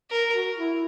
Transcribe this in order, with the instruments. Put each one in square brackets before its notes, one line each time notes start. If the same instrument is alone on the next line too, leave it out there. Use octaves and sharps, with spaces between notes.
[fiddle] A#4
[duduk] F#4
E4